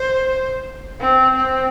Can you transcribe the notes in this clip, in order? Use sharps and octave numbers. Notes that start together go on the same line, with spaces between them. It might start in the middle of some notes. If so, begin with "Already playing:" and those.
Already playing: C5
C4
C4